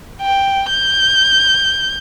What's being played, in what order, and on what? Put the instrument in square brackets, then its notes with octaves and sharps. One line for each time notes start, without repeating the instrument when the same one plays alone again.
[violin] G5
G6